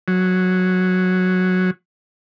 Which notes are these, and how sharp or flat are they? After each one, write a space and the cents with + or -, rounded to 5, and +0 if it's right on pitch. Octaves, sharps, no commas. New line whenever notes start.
F#3 -5